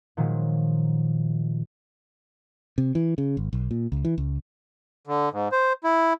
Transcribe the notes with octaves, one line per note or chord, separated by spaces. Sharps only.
A#2 D#3 F3 F#3 G#3
C3
E3
C#3
G#1
B1
A#2
C#2
E3
C#2
D3
G#2
C5
E4